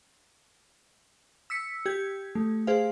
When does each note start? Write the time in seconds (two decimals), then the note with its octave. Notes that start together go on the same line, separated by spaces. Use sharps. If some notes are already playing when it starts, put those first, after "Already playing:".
1.50 E6 B6 C#7
1.86 G4 G#6
2.35 A3
2.67 G#4 C5 F5